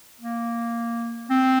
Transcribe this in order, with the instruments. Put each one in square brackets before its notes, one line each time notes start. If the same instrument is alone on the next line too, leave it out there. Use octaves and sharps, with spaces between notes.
[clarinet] A#3
C4